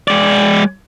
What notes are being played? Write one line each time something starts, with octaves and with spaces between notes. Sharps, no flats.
G#3 D5